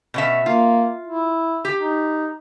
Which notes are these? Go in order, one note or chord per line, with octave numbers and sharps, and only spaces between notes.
B2 C#4 E5
A#3 F4
E4
G4
D#4